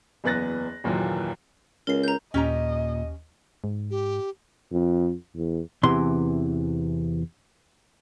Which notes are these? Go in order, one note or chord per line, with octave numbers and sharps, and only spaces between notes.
F#1 E2 B3 F#6 A6 A#6
F#1 D#2 A#2 E3 F#3
C#2 A#4 C7
A#5 G6
D#2 A#2 C#4 G4 D#5 A#5
G#2
G4
F2
E2
E2 C3 E3 C6